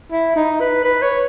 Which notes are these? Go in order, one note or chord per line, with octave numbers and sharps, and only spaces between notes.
E4
D#4
B4
B4
C#5